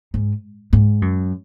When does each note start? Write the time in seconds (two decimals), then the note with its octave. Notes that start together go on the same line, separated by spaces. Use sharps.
0.14 G#2
0.73 G#2
1.02 F#2